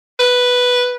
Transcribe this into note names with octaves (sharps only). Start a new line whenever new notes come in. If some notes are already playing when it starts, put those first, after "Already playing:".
B4